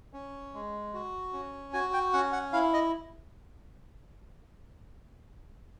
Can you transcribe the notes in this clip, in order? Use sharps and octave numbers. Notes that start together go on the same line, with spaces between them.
C#4
G#3
F#4
C#4
F#4 G#5
G5
C#4 F#5
F#5
E4 F5
D#5